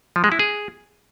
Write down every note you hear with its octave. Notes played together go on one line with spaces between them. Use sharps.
F3
G#3
E4
G#4